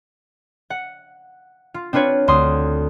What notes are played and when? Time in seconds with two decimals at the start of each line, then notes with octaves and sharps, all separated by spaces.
0.70 F#5
1.74 F4
1.93 C4 D4 F4 B4 C#5
2.28 D2 C6 D#6